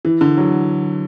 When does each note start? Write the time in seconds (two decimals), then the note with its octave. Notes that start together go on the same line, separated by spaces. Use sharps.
0.05 E3
0.21 D3
0.38 F#3